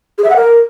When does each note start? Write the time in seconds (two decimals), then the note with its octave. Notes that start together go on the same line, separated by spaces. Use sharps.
0.18 G#4
0.24 E5
0.30 F#5
0.36 A#4